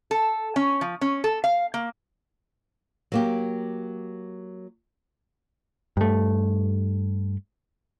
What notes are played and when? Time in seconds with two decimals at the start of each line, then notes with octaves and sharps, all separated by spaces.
0.11 A4
0.56 C#4
0.81 F3
1.01 C#4
1.24 A4
1.44 F5
1.74 A#3
3.12 F#3 A#3 G4
5.97 G2 A3